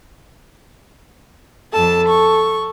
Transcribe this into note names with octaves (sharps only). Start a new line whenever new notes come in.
F2 A4 A5
C#6